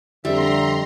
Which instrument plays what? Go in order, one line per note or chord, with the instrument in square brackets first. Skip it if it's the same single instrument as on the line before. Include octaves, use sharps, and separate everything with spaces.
[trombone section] F2 D3 [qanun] G3 [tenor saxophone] E5 [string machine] A#5 C6